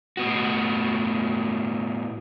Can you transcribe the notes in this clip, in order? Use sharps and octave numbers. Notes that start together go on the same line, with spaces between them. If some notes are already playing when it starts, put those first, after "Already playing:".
A2 B3 F#4